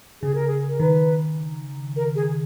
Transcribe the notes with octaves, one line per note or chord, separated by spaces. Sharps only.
C#3 G#4
A#4
G#4
A#4
D#3 B4
A#4
G#4